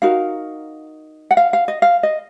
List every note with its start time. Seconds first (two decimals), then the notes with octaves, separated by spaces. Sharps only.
0.02 D#4 F#4 A#4 F5
1.31 F#5
1.37 F5
1.53 F5
1.68 D#5
1.82 F5
2.03 D#5